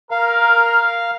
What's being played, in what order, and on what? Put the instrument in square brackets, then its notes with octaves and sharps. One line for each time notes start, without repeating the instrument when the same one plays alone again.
[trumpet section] A#4 [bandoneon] F5